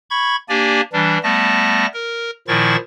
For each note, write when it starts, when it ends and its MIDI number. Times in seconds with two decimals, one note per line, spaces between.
0.10 0.36 83
0.10 0.36 85
0.10 0.36 92
0.49 0.81 58
0.49 0.81 62
0.49 0.81 67
0.49 0.81 74
0.49 0.81 80
0.93 1.18 52
0.93 1.18 55
0.93 1.18 62
1.23 1.86 55
1.23 1.86 57
1.23 1.86 59
1.23 1.86 81
1.23 1.86 94
1.93 2.30 70
2.48 2.76 46
2.48 2.76 51
2.48 2.76 53
2.48 2.76 64
2.48 2.76 85
2.48 2.76 93